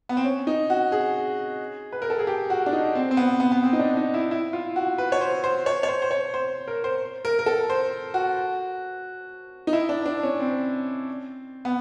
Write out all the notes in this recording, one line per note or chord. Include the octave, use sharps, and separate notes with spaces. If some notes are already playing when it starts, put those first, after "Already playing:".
B3
C4
C#4
D#4
F#4
G#4
B4
A#4
A4
G#4
G4
F#4
D4
D#4
C4
C4
B3
B3
B3
C4
D#4
D4
D#4
E4
E4
F4
F#4
B4
C#5
C5
C5
C#5
C#5
C5
C5
C#5
C5
A#4
C5
A#4
A#4
A4
C5
F#4
D#4
E4
D4
D4
C#4
C4
B3